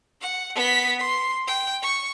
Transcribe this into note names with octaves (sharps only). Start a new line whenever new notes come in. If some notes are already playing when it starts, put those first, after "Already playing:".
F#5
B3 B6
C6
G5
C#6